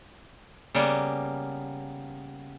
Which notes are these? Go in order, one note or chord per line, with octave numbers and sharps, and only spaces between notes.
C#3 G3 A#3 B3